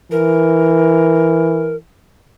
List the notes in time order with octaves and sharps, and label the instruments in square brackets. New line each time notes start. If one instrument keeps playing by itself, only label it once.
[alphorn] E3 [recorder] A#4